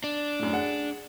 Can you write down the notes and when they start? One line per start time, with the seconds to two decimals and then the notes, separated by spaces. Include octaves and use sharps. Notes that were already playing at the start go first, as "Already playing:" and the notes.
0.04 D4
0.39 F#2 A2
0.53 G#4 F#5